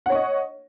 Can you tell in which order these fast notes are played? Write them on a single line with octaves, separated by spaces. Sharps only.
F#5 C#5 C#6 D#5